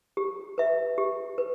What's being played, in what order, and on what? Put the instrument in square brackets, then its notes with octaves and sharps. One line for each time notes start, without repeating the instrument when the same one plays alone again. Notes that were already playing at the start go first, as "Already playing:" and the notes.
[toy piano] G4
B4 E5
G4
B4